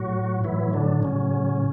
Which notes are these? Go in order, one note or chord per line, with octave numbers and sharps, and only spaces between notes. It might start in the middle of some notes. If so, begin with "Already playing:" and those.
Already playing: A2 F#3 F#4
A2 E3 F#3 E4
D3 D4
A2 C#3 F#3 C#4